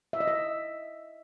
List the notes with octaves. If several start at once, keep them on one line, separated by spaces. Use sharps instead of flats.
E5
D#5
E5